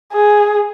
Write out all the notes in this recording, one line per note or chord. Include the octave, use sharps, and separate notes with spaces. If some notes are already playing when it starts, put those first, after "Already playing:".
G#4